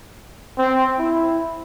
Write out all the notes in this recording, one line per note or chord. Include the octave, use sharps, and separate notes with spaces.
C4
E4